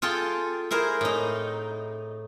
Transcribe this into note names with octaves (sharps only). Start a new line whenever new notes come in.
F4 G#4 A4 G5
E4 G#4 A#4 C5
A2 D#4